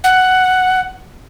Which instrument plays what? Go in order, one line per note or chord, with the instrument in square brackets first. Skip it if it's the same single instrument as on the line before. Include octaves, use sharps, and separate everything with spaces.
[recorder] F#5